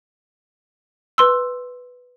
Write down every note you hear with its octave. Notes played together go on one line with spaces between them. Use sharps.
B4 C6 E6